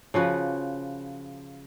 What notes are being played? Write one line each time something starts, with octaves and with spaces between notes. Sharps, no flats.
C#3 F3 F#4 B4